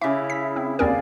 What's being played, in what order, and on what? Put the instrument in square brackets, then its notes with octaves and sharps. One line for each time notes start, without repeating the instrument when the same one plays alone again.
[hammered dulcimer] C#3 D6 [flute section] E4 [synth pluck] E5
[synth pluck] B6
C4
[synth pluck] D#2 C4 A#4 [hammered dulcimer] G#4 [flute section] D5 F5